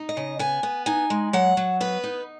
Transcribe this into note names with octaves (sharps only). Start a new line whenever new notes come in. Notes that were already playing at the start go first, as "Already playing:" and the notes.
Already playing: D#4
D#5
C#3
B3 G#5
B3
D#4 G#5
G#3
F#3 F#5
F#3
B3 B4
D#4